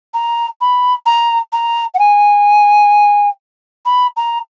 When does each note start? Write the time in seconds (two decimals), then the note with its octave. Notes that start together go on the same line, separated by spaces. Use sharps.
0.14 A#5
0.61 B5
1.06 A#5
1.53 A#5
1.94 F#5
1.99 G#5
3.86 B5
4.17 A#5